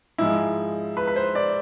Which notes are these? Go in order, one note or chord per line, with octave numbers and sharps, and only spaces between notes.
G#2 F3 G#3 E4
B4
B4
C5
D5